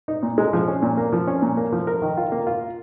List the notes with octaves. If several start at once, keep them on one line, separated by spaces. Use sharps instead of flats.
D#4
A#2
G#3
F3
C#4
A#2
A#3
F3
C#4
A#2
A#3
F3
A#4
D#3
F4
A#3
F4